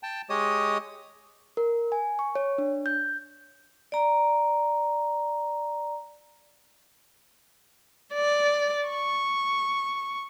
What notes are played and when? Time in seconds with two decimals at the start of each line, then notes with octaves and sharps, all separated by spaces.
0.03 G5 A5
0.30 G#3 G4 C#5 D#5 D#6
1.57 A#4
1.92 G#5
2.19 C#6
2.35 C#5
2.58 D4
2.86 G6
3.92 D5 A#5
8.13 D5
8.88 C#6